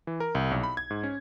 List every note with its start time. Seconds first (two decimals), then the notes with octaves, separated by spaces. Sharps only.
0.07 E3
0.20 A#4
0.35 C2
0.51 B1
0.63 B5
0.77 G#6
0.90 G#2
1.03 C#4